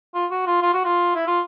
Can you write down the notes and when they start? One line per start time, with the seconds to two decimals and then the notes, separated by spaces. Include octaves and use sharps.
0.15 F4
0.31 F#4
0.47 F4
0.62 F4
0.74 F#4
0.85 F4
1.15 E4
1.27 F4